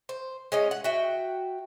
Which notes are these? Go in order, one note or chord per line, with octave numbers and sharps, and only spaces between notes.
C5
G#3 C#4 D#5
F#5
F#4 E5 G5